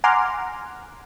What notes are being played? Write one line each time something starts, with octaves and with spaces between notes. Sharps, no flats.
F#5 G#5 A#5 C6 D6 F6